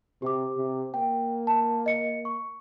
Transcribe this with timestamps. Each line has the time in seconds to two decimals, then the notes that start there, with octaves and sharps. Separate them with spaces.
0.22 C3 G4 D6
0.58 C3
0.94 A#3 G5
1.47 A5
1.86 D#5 C#7
2.25 C#6